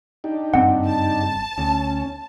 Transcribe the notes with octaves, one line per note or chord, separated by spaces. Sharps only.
D4 D#4 G4
F#1 G2 C4 F#5
A5
D2 C#4